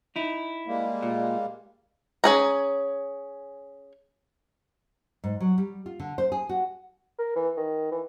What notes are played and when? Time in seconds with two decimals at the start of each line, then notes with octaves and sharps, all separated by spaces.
0.16 D#4 E4
0.67 G3 G#3 A#3
1.03 A#2
2.24 C#4 G#4 A#5
5.24 G#2
5.40 F#3
5.58 G3
5.86 F4
6.00 D3
6.18 C5
6.32 G#4
6.49 F#4
7.18 A#4
7.36 E3
7.57 D#3
7.92 E3